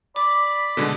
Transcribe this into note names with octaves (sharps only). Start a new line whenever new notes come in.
D5 B5 D6
B2 D3 G#3 A4